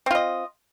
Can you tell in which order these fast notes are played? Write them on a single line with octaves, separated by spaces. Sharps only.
C4 F4 D#5